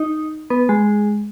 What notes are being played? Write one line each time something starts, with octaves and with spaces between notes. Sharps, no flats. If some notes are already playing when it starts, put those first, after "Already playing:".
Already playing: D#4
B3
G#3